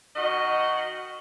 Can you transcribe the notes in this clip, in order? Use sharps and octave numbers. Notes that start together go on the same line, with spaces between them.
D#3 F#4 D#5